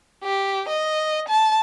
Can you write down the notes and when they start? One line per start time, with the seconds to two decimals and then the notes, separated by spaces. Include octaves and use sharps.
0.24 G4
0.69 D#5
1.29 A5